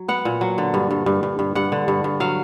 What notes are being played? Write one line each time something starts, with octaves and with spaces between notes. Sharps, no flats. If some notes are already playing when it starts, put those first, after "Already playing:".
Already playing: F#3
B3 F#5
A#2
F#3
D3
G2
G2
G2
G2
G2
G2 F#5
D3
G2
G2
F#3 F5